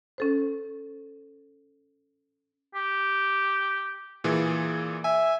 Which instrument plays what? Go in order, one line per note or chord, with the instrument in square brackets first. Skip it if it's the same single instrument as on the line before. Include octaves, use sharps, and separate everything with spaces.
[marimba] C#4 A4 C5
[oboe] G4
[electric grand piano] A#2 E3 G#4
[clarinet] E5 [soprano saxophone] G#5